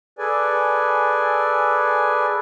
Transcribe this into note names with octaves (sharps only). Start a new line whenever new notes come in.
G#4 A4 B4 D5 G#5